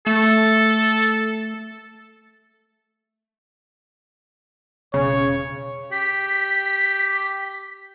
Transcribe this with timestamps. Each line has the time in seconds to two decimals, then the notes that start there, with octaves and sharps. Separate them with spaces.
0.07 A3 A4
4.94 E1 C#3 C#5
5.92 G4 B6